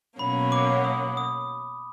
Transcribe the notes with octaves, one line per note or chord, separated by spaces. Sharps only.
B2 F#3 A#3 C#4 B5
D6
D#6
D#6